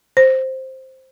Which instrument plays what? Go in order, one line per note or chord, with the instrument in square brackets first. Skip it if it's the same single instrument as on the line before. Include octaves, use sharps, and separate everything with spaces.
[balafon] C5